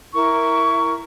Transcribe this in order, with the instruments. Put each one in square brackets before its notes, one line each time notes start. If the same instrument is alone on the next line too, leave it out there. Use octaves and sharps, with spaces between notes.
[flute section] E4 A#4 C#6